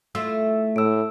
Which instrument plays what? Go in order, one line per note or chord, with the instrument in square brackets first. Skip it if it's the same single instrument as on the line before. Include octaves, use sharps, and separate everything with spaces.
[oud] A3 E4 F4 [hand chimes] E6
[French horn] A2 [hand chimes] E6 D7